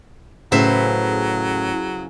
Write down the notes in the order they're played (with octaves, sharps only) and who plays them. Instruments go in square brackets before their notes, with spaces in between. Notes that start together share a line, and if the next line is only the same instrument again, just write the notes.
[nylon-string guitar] A2 [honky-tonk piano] C#3 [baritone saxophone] F#3 [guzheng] B4 C5 E5